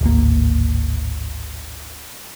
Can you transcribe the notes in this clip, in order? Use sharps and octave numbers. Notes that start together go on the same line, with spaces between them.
D1 G#1 A#3